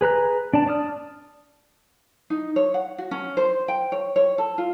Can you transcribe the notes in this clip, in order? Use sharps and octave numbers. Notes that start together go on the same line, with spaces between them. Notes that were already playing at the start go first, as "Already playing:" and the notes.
G#4 B4 A#5 F#6
D4 D5 A5
D5 A5 D#6 F6
D#4
C#5
F#5
F#4
C#4
C5
G5
C#5
C#5
A4
F4